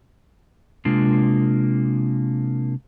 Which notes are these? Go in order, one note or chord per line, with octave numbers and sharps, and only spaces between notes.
C3 G#3 A#3 D4 F4